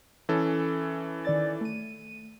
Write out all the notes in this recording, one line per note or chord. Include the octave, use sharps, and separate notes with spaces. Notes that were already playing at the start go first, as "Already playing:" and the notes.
E3 C#4 A4
D#3 D5 A6
A3 D#7